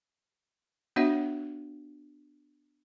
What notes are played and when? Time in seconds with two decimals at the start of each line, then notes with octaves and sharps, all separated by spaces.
0.96 B3 D4 F#4 C#5 E5 F#5